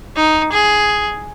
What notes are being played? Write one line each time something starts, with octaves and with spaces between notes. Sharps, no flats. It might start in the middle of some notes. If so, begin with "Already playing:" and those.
D#4
G#4